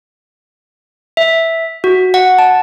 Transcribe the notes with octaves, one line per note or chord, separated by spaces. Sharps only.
E5
F#4
F#5
A5